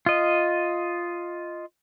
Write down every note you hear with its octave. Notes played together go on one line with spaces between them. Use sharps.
F4 D#5